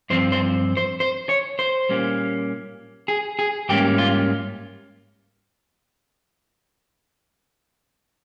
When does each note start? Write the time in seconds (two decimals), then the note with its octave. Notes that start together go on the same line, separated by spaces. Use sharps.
0.10 G2 F3 C4 C5
0.32 C5
0.77 C5
1.00 C5
1.29 C#5
1.59 C5
1.89 A#2 G3 A#3 C#4
3.08 G#4
3.39 G#4
3.69 G#2 G3 A#3 C#4 G4
3.98 F4